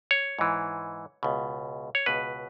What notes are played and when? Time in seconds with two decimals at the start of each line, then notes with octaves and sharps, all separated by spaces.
0.11 C#5
0.39 G#2 E3
1.23 C#2 B2
1.95 C#5
2.06 C#2 B2 B4